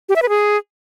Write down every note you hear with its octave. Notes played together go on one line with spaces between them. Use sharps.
G4
E5
B4
G#4